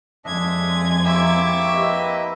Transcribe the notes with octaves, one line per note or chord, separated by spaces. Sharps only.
F2 G#3 D4 D#5 E5 G#6
A#3 C4 E4 G4 E5 C#6 D6
G4 B4 D#5